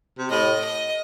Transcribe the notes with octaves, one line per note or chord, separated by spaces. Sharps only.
C3
A2 D#5
D#5